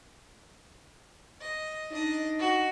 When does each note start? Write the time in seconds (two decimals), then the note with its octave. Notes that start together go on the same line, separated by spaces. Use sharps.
1.41 D#5
1.91 D4 D#4 D#5
2.39 F#4